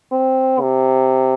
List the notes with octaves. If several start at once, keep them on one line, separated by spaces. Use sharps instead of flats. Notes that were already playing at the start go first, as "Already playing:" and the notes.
C4
C3